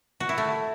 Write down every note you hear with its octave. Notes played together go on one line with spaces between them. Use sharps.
F#4
E4
A3